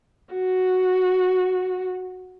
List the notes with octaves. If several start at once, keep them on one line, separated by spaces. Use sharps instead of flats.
F#4